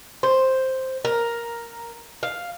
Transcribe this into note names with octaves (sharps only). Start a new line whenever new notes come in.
C5
A#4
F5